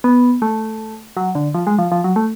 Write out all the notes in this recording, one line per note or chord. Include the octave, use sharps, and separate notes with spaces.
B3
A3
F#3
D3
F3
G#3
F3
F3
F#3
A3